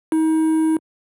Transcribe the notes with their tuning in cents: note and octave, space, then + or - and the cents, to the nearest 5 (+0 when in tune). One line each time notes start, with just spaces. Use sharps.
D#4 +35